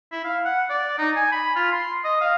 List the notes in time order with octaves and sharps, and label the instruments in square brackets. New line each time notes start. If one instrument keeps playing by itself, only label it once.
[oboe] E4
F5
F#5
D5
D#4
G#5
B5
F4
C6
D#5
F5